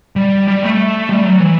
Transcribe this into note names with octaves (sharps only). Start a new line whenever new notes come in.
G3
G3
A3
G3
F#3
E3